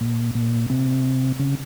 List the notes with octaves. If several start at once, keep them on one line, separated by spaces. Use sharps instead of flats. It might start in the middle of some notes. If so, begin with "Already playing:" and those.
A#2
A#2
C3
C#3